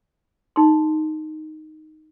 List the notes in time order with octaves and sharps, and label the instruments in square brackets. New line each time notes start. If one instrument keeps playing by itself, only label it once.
[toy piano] D#4 C6